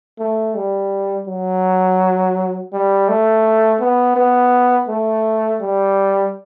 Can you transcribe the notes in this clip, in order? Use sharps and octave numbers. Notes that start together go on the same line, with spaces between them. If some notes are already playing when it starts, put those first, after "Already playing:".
A3
G3
F#3
G3
A3
B3
B3
A3
G3